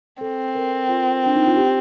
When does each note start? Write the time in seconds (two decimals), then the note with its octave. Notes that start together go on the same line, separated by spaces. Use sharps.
0.21 C4 A4
0.55 A#4
0.89 F4
1.26 D4
1.36 D#4
1.46 F4
1.56 G4